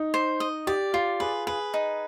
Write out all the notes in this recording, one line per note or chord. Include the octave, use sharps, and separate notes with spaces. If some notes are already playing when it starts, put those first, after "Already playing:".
Already playing: D#4
C5
D#5
G4 D5
F4 G4
G#4 B4
G#4 B4
D#4